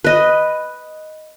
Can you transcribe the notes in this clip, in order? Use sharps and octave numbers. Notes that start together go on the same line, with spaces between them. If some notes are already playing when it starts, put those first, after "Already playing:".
B4 D#5